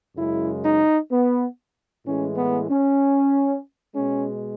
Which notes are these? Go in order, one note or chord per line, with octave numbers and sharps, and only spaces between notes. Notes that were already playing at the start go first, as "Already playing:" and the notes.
F#2 C#3 G#3 E4
D#4
B3
A2 E3 G#3 C#4
B3
C#4
B2 G#3 C#4